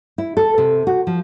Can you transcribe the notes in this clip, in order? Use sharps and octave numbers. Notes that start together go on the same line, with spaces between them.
E4
A4
C3
F#4
F3